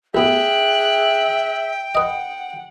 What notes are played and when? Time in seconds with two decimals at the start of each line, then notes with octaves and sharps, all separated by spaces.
0.15 A1 B3 G#4 E5 G5 F#6
1.95 B4 D#5 F#5